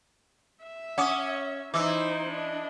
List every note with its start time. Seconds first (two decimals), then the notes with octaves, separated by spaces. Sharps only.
0.63 E5
0.98 C#4 F#5 D6 D#6
1.74 E3 D#4 C5 D6 E6
2.30 D4 D#5